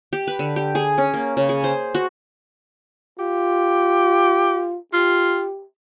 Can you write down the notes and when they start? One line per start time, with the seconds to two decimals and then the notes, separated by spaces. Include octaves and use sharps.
0.13 G4
0.27 B4
0.39 D3
0.56 G4
0.75 G#4
0.98 C#4
1.14 A#3
1.37 C#3
1.49 G#4
1.64 C5
1.95 F#4
3.19 F4 G4
4.93 F4 G4